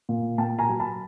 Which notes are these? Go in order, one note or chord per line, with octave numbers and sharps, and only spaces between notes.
A#2
A#2 G5 A5
G#5 A#5
F#3
A5 B5